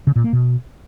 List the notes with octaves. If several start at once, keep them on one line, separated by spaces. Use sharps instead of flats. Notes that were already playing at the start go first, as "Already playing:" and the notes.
C#3
A#2
A#3
B2